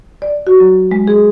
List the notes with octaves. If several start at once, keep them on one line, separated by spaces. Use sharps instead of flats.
D5
F#4
F#3
G#3
G#4